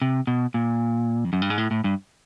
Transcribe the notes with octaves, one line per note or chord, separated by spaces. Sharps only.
C3
B2
A#2
F2
F#2
G2
G#2
A2
A2
G2